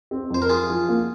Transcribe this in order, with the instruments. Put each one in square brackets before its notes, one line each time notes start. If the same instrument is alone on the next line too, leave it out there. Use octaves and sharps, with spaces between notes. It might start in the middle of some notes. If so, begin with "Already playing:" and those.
[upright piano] C4
[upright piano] F2 [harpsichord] C5
[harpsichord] A#4
[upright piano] F3 [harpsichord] F4 G#4
[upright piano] F3
A#3